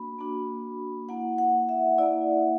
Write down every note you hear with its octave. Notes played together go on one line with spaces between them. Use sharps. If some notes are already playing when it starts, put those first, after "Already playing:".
Already playing: A#3 D4 F#4 B5
A#3 D4 F#4
A#3 E4 F#5
F#5
E5
A#3 E4 D5